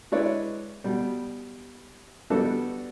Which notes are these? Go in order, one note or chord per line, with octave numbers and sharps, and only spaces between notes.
G#3 D4 E4 B4 C#5 D5
B2 G3
G3 B3 D4 F#4 A4